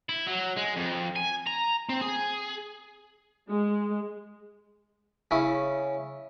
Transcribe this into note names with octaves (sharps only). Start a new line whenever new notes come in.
E4
F#3
G#3
F2
G#5
A#5
C4
G#4
G#3
C#3 C#4 E4